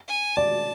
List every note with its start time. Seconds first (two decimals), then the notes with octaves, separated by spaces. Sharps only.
0.09 G#5
0.37 D5 A5